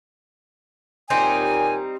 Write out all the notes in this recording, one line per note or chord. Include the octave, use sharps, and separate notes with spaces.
D#2 A#2 G3 C4 D#4 G#5